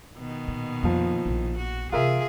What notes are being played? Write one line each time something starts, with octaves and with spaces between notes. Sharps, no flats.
B2 D#3
A#2
F2 A#2 F3
A#1 E4
F#4
C3 E3 F4 G#4 A#4 E5